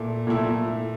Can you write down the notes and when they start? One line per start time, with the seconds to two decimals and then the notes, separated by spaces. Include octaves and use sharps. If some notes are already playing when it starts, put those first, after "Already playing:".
Already playing: A#2 A3 E4
0.27 A#2 A3 E4